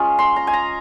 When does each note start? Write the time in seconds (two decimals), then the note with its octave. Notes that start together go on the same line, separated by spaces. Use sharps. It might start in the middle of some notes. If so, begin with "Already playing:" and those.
Already playing: G#3 C#4 F4
0.19 C6
0.36 A#5
0.47 G#5
0.53 A#5